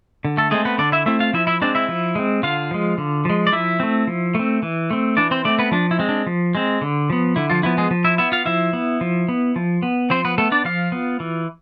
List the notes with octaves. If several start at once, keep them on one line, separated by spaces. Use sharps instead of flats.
D3
A3 A4
G#3 A3 C4 G#4
B3 B4
D3 D4 D5
E4 E5
A3 C4 E4 E5
F4 F5
F3 E4 E5
E4 E5
G#3 C4 D4 D5
E4 E5
F3
G#3 C4
D3 F4 F5
F3 G#3
D3
F3 G#3
D5
F3 E4 E5
A3 C4
F3
A3 C4
E3
A3 C4
E3 D4 D5
C4 C5
A3 C4 D4 D5
B3 B4
F3 D4
E4
G#3 C4
D4
F3
G#3 C4
D3
F3 B3
D3 E4
F3 F4
F3 B3 E4
G#3 G#4
F3
E4 E5
B3 E4 E5
F4 F5
F3 E4 E5
B3
F3
B3
F3
B3
F3 C4 C5
B3 B4
A3 B3 A4
D4 D5
F3 F4 F5
B3
E3